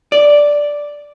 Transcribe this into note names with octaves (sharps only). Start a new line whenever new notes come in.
D5